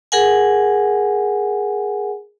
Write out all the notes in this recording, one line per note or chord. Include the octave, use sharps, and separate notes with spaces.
G#4 A#4 F#5 G#5